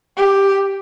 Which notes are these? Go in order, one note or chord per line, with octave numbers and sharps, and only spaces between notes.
G4